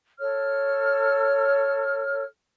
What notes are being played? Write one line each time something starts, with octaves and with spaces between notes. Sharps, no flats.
A4 C#5 F6